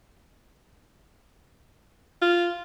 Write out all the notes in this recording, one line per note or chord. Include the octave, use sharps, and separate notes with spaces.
F4